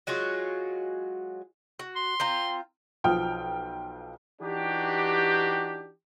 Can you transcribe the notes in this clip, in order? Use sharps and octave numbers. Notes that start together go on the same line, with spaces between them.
F#3 G#3 F4 F#4
F#4
C6
C4 F4 A#5
B1 F3 F4 G5 D#6 F6
E3 D4 D#4 F#4 G4